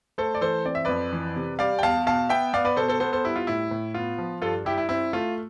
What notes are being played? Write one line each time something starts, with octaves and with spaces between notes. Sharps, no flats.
A3 A4 C5
D5
E3 A4 C5
C4 D5
E5
F2 B4 D5
E3
C3
G3 D5 F5
G5
E2 F5 A5
B2 F5 A5
B3 E5 G5
B3 D5 F5
B4 D5
B2 A4 C5
A4 C5
B3 A4 C5
A4 C5
G3 E4
F4
A2 E4
A2
B3 F4
F3
G2 F4 A4
G2 E4 G4
E4
C4 E4
A3 F4